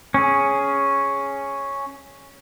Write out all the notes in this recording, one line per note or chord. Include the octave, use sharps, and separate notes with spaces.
C#4 G#4